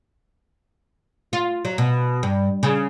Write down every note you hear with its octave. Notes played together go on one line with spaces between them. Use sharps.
F4
F#3
B2
G2
C#3